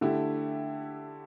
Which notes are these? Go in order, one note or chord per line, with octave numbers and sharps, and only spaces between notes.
D3 A3 E4 G4